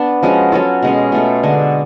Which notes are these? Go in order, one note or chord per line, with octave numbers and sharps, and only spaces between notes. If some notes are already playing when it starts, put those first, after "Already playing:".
Already playing: B3 D4
F3 G#3 C#4 F#4
F#3 C#4 F4 A4
B2 G#3 C#4
B2 A3 F4
D3 G#3 D4